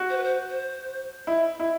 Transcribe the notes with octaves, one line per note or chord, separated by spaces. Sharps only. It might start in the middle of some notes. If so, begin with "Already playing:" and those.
Already playing: F#4
C5
B4
C5
C5
E4
E4